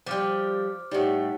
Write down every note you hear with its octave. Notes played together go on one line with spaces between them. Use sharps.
F3 G3 C5 D6 F6
A2 G3 D#4 G4 F#5